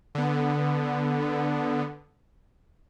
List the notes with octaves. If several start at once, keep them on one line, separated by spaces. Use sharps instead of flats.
D3 B3